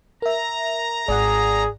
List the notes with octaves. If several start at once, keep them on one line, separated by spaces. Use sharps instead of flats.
A#4 E5 A#5
G#1 G#4 D5 F#5